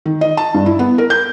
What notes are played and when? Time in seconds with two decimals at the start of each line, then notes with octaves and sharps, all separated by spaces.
0.06 D#3
0.21 D#5
0.37 A5
0.54 G2
0.66 E4
0.79 B3
0.98 A#4
1.10 G6